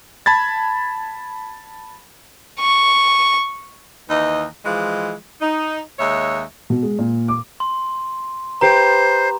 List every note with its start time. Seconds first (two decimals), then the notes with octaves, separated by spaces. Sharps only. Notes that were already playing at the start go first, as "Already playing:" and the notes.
0.26 A5 B5 G#6 A6
2.60 C#6
4.09 D#2 E3 D#4 D#5
4.65 E3 F3 G#3
5.41 D#4
5.98 D#2 G#3 C#5 E5
6.70 B2
6.83 G#3
6.99 A#2
7.28 D6
7.60 C6
8.61 G4 B4 C5 A#5